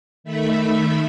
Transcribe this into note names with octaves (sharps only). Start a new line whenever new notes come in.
D#3 A3 E5 B5